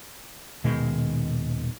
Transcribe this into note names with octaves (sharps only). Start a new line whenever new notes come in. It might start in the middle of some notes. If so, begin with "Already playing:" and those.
D#1 B2 D#3 G#3